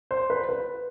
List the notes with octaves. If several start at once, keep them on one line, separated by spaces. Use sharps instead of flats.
C5
B4
B4